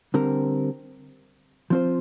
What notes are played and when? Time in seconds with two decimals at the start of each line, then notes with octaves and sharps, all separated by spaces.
0.14 D3 G3 C4 A#4
1.70 F3 C4 F4 C5